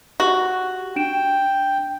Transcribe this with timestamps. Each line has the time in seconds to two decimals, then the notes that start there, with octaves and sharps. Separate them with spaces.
0.20 F#4 G4
0.96 D4 G5 D7 E7